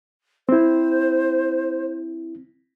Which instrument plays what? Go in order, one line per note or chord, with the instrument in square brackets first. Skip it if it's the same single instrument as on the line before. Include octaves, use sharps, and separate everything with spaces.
[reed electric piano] C4 E4 [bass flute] C5